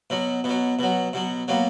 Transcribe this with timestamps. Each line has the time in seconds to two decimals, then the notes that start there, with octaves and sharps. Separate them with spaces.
0.10 B2 F#3
0.44 B2 F#3
0.79 B2 F#3
1.13 B2 F#3
1.48 B2 F#3 A#3